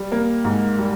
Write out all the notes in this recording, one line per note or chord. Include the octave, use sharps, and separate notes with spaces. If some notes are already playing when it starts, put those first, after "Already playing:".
Already playing: G3
A#3
G#2
G3